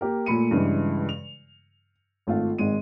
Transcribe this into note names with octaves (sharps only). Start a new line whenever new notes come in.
A#3 G4 A#4
A#2 A3 B5 C#7 D#7
G2 C#3 E3 G#3
F7
G#1 A3 F4 F5
G#1 G#3 D#7